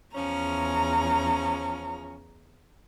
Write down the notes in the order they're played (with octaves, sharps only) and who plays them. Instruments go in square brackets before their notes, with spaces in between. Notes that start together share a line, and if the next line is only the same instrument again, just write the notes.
[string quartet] E2 C#3 A#5 [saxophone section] F3 C#4